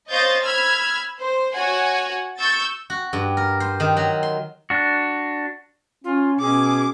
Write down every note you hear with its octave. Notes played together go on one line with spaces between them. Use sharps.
C5 C#5 D#5 F5 G6 A6
B5 E6 F6 G#6
C5
F#4 C#5 F#5 G#5
C#6 E6 G6 A6
F#4
G2
A#4
C5
D#3
F#3
C6
D4 F#4
C#4 F4
B2 C#4 G#4 D6